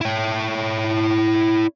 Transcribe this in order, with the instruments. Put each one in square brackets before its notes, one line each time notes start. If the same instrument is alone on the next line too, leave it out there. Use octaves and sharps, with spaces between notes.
[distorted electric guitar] E4 C#5